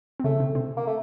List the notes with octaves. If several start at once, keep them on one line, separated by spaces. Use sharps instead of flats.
C4
C#3 A3 C#4
C3 C4
C3 C4
A#3
A3